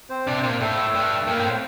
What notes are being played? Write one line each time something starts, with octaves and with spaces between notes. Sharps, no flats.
C4 C5
C3 D4 D5
C4 C5
A#2
A2 A3 A4
G2
G2 A#3 A#4
A2
C4 C5